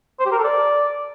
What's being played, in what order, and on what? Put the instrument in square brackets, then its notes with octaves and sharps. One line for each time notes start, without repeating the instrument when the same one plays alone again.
[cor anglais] C5
G4
A#4
A4
D5